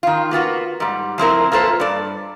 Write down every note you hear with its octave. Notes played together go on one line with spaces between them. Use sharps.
D#3 F4
A#3 B3 F4 F#4
G#2 G3
F3 C4 E4 A#4
A#3 F4 A4 B4 C5
G2 D5